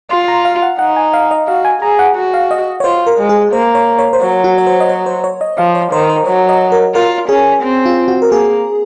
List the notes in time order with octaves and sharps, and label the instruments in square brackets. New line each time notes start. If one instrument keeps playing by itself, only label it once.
[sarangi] F4 [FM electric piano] C6
[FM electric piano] A#5
F5
F#5
[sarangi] D#4 [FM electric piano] F#5
[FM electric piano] G#5
F5
D#5
[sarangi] F#4 [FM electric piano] F5
[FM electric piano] G#5
[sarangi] G#4 [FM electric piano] A#5
[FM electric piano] F#5
[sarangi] F#4
[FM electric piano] F5
D#5
C#5
[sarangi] F4 [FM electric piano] C5
[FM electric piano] A#4
[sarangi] G#3
[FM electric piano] G#4
[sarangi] A#3 [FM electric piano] C5
[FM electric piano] C#5
C#5
C5
[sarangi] F#3 [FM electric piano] C#5
[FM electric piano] F#4
C#5
C5
D#5
C#5
C5
C#5
D#5
[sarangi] F3 [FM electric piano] F5
[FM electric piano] C#5
[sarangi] D#3 [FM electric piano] C5
[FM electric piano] C5
[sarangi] F#3 [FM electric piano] C#5
[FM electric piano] D#5
A#4
[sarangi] F4 [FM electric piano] A#4
[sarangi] C#4 [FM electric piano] G#4
[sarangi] C4
[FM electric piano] F4
F#4
A#4
[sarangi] A#3 [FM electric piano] G#4